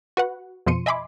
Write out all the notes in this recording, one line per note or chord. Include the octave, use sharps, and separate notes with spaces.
F#4 B4 F#5
F2 B2 F3 C6 C#7 D#7
D#5 E5 G#5 B5 C6 D6